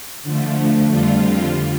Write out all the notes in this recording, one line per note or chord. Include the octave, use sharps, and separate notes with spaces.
D3 F3 A3
F2 D3 G3 F4